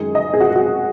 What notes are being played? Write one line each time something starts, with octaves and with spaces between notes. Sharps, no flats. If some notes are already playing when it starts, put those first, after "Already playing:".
Already playing: F#2 D#3 G#3 D#4 G#4
D#5
G#4
F#4
F#4